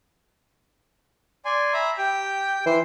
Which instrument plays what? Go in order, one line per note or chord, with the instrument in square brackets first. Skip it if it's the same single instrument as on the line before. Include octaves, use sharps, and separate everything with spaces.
[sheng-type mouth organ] D5 G#5 C6
E5 A#5 B5
[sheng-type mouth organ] G4 [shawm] G5
[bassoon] E3 [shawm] C5